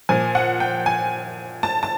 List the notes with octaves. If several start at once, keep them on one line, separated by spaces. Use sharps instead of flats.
A#2 F3 G#5
F#5
G5
G#5
A5
A5